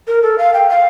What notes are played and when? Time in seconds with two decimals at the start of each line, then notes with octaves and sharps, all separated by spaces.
0.07 A#4
0.23 A4
0.38 F5
0.54 G5
0.69 F5